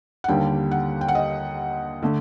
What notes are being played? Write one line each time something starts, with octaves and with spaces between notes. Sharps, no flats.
F#5
D#2 D3 G3 A#3 G5
F#5
G5
F#5
D#5
D3 A3